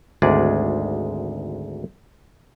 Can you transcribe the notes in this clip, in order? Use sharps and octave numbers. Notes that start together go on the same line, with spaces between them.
G#1 D2 G#3 G#4 D5